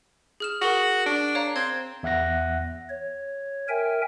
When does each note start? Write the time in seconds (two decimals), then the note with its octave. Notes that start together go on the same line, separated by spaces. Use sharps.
0.40 G#4 F6 E7
0.62 F#4 G#4 A#4
1.06 D4
1.35 C#5 F5 A#5
1.56 C4 G#6
2.03 E2 E5 F#5 F#6 A#6
2.90 C#5
3.69 A#4 E5 G5 G#5